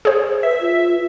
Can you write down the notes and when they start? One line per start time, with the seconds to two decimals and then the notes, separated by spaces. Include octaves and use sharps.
0.05 G#4 C5
0.43 B4 E5
0.61 F4